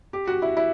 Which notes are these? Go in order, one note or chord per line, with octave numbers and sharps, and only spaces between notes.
G4
F#4
E4
E4